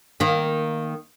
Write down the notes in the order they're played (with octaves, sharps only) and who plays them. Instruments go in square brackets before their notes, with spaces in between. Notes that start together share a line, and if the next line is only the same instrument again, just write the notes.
[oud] D#3 A#3